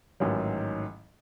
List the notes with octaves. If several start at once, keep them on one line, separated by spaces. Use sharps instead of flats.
A1 G#2 D#3 F#3